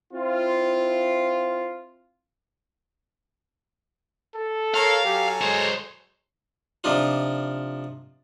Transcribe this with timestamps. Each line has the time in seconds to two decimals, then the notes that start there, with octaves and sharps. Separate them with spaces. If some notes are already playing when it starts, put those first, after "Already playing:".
0.12 C4 E4 F4
4.34 A4
4.74 A#4 C#5 F5
5.05 F#3 G4 A4 G#5
5.41 G#3 C5 C#5
6.84 C3 F3 D4 D#4 F4